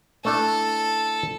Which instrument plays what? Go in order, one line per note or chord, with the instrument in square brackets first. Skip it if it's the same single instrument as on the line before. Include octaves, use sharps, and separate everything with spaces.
[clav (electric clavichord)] A3 D4 E4 [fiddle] A4